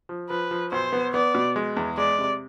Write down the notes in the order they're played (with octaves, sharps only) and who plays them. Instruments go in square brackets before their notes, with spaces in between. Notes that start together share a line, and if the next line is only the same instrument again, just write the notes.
[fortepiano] F3
[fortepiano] F3 [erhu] B4
[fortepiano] F3
[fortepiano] B1 [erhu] C5
[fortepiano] B3
[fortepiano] B3 [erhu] D5
[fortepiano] B2
G#3
E2
[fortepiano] G#3 [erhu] D5
[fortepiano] C3